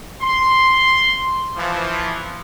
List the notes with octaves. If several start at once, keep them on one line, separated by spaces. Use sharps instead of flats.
C6
E3 F3